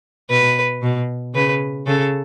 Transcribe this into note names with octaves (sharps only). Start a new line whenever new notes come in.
B2 B4
B2
C#3 B4
C#3 A4